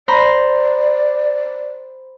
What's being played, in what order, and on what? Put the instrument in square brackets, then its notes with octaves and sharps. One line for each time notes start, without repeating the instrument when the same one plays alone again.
[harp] C5 A#5 B5 [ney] D5